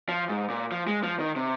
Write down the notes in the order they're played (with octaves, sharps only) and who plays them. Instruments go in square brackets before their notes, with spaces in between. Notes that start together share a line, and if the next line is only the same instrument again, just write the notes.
[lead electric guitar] F3
G#2
A#2
F3
G#3
F3
D#3
C3